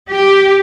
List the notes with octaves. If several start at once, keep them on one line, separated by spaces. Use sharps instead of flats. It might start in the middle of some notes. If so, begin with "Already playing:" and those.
G4